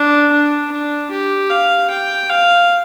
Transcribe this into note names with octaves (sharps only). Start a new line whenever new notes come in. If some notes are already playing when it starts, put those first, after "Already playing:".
Already playing: D4
D4
D4
G4
F5
G5
F5